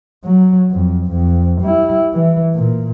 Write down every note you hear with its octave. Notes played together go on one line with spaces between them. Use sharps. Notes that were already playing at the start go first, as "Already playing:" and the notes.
F#3
F2
F2
G3 E4
E3
A#2